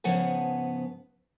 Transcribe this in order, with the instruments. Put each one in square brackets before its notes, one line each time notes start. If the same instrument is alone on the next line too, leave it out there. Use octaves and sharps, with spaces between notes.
[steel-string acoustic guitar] G#2 C#3 F3 B3 F#5 G#5